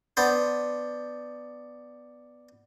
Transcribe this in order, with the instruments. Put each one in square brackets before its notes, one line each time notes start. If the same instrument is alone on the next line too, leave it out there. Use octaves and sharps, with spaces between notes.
[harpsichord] B3 D4 C5